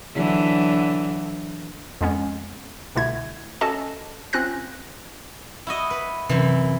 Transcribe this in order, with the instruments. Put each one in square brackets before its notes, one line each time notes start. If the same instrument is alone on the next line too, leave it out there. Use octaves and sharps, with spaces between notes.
[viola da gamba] D3 E3 F#3
[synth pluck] F2 G#3 B3 C#4
C2 B2 D3 A3 E4 G#6
C#4 F#4 A4 D#5 A5
C4 C#4 F4 C5 F#6 A#6
[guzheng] E4 F#4 D#5
B4
[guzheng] F#2 E3 [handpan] C3